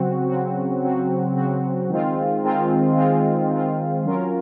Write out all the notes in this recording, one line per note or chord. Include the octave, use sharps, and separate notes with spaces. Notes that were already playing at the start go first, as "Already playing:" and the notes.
Already playing: C#3 F#3 C4 F#4
C#3 F#3 C4 F#4
C#3 F#3 C4 F#4
C#3 F#3 C4 F#4
D#3 G#3 C4 F4
D#3 G#3 C4 F4
D#3 G#3 C4 F4
D#3 G#3 C4 F4
F#3 C#4 F4 A#4